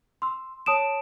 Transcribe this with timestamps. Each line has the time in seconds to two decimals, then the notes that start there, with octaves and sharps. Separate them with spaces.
0.22 C6 E6
0.66 C#5 A5 D#6 D7 E7